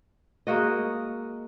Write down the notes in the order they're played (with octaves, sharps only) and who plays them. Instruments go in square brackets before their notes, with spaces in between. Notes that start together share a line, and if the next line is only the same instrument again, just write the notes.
[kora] G#3 A#3 F#4 D#5